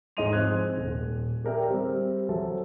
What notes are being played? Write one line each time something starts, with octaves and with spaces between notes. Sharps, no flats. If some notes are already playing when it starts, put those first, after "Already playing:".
G#2 G#4 D#5 C6 D#7 F7
F3 C4 F#6 G#6
D#1
G4 G#4 A#4 D5 E5 G5
G3 C4
F#3 G#4 A4 C5 E5